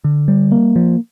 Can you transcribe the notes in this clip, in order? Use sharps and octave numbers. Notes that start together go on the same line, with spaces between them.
D3
G3
A#3
F3